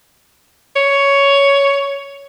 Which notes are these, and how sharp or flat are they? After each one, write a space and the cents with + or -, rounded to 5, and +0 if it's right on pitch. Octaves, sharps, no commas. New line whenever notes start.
C#5 +10